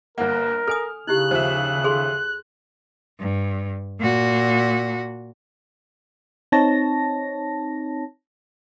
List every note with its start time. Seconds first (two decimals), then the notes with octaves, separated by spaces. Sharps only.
0.18 G1 A#3 A#4 F#5
0.68 A4 G#5 D#6 F6
1.07 C#3 D#4 E4 G4 F#6
1.31 D#2 F3 C5 E5
1.84 G#4 A4 C6
3.20 G2
4.00 A#2 F#4
6.52 C4 D#4 C#5 A5 A#6